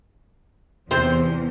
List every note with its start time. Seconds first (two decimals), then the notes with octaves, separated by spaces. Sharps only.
0.91 E2 C3 C5